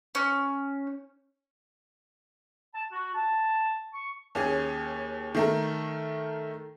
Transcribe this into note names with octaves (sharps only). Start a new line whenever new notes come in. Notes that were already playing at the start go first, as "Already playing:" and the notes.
C#4
A5
F#4
A5
C#6
D#2 C#4 G#4
D#3 A3 A#4